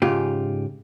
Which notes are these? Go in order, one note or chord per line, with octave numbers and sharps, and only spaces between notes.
G#2 C#3 F4 G4